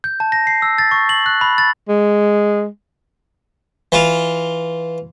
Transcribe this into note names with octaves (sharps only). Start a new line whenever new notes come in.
G6
A5
A#6
C7
E6
A6
C#6
F#7
F#6
B5
A6
G#3
E3 F4